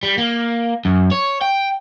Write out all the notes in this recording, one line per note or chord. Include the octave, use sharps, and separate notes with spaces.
G3
A#3
F#2
C#5
G5